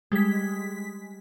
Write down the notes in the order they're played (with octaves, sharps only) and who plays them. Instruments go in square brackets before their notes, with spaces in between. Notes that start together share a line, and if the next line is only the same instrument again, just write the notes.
[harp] G3 [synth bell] G#3 B6